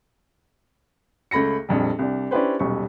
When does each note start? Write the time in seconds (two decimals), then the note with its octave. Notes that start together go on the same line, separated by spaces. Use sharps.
1.31 C#2 A3 B5 A#6 C#7
1.69 A#1 F2 G3
1.99 C2 D4
2.31 C#4 D4 E4 G4 B4 C5
2.59 D#1 B1 C#6